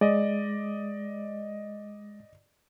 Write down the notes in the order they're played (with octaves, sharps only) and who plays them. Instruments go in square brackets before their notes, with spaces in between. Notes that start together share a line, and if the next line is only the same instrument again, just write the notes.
[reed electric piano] G#3 [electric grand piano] D5 D#5